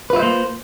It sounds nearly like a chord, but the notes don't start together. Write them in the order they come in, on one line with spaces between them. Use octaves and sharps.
B4 F4 E5 C5 A#3